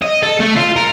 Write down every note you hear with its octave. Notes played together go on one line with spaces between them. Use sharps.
D#5
A4
A3
F4
A#4